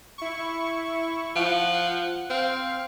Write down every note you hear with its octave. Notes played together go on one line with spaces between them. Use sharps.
E4 C#6
F3 F#5
C4 F5